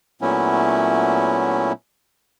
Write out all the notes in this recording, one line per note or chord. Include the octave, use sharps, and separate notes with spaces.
A#2 F#3 A3 B3 C#4 E4